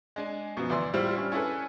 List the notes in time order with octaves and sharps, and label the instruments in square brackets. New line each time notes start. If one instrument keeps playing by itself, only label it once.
[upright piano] G#3 D4 G#5
F#2 B2 F3
D2 E3 D5 C6 E6
A2 G3 E4 F4 C5 F6
G3 C#4 D4
C#4 E4 G#4 A4 B4